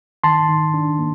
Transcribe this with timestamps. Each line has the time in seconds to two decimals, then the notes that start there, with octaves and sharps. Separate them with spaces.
0.24 D#3 A5 C6
0.49 D#3
0.74 D4
0.99 A#3